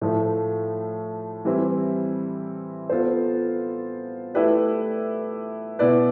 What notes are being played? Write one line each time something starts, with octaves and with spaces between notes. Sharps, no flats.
A2 F3 A3
E3 G3 C4 E4
B3 F4 A4 C5
A3 E4 G4 B4 D5
B2 B3 E4 B4 D5